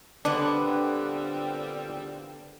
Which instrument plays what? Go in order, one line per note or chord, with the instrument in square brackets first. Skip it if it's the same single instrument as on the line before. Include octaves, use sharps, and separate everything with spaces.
[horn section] A#2 G3 C4 [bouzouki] D3 B3 B4 [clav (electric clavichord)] D4